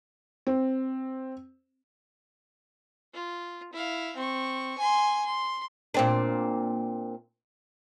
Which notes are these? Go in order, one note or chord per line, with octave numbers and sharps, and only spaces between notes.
C4
F4
E4 F5
C4 C#6
G#5 C6
C6
A#2 C4 D4